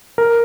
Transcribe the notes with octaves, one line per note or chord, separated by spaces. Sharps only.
A#4